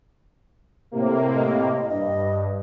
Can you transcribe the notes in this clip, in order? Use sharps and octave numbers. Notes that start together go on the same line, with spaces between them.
A2 C3 A#3
D#5
G2 D#5